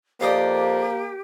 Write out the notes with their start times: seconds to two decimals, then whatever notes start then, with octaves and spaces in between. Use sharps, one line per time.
0.21 F2 A#3 F4 G4 D5 D#5